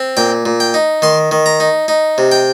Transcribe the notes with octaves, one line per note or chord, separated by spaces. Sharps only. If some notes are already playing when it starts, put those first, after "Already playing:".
Already playing: C4
A#2 G5
A#2
G5
D#4
D#3 C6
D#3
A#5
D#4
D#4
C3
G5